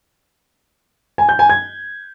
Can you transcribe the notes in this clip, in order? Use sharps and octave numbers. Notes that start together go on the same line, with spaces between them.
G#5
G6
G#5
G#6